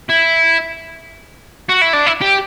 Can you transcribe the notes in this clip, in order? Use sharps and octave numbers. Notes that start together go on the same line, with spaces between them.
E4
F#4
E4
D4
E4
G4